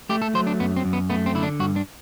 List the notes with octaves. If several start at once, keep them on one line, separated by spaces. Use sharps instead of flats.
A3 G4
A4
F#3 C5
D4
F#2 B3
C4
F#2
B3
A3 B3
C4
D3 E4
D4
G2 F#4
D4